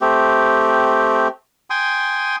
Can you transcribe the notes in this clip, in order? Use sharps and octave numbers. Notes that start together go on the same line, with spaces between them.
A3 C4 G4
G5 G#5 C6 D#6